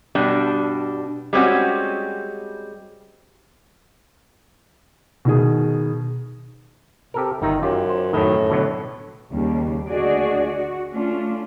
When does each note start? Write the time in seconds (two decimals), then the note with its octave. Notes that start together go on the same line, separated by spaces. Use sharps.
0.15 G2 B2 G3 D4
1.33 G3 G#3 C4 C#4 F#4
5.25 B2 D#3 G#4
7.14 C3 G4 A4 A#4
7.42 G1 D#3 D#4 E5
7.62 F#2 F4 G4
7.89 C5
8.13 F#2 A2 D#3
8.50 B2 D3 F#3
9.31 D#2 C#3 G3 A#3
9.88 D2 D4 F#4 G#4 D5 D#5
10.47 F#4
10.93 A3 C#4 D4 F4